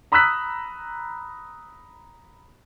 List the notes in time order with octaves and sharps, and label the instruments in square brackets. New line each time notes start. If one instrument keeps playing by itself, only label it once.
[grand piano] A#5 B5 D#6 E6 F#6 B6